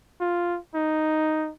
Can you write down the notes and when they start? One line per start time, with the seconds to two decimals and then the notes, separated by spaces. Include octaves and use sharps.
0.21 F4
0.75 D#4